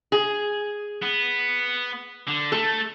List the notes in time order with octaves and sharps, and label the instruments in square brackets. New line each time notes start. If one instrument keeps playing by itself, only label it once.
[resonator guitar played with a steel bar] G#4
[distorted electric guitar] B3
D3
[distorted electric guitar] A3 [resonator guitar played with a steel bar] A4